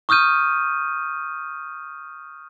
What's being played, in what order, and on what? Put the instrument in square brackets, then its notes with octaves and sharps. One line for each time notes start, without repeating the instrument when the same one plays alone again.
[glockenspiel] C#6 D#6 F6 G6 D#7